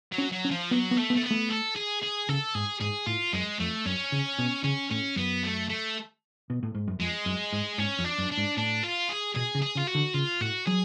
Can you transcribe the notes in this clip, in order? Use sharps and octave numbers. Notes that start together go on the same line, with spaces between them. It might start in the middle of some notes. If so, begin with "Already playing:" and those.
F#3
C#4
F#3
C#4
F3
F#3 B3
B3
A3
B3
A3
B3
A3
A4
G#4
G#4
C#3 A4
G#2 G#4
G#2 G#4
A2 F4
F#2 G#3
F2 A3
F#2 C#4
C#3
B2
C#3 C#4
A2 C#4
F#2 B3
A3
A3
B2
A2
G#2
F#2
F2 G#3
F#2
G#2
G#2 C#4
F2
D4
F#2
D4
G#2
A2 D4
F4
G#4
B2 G#4
C#3
G#4
C#3 F4
F#4
D3
C#3 F4
A2 F#4
F#3 G#4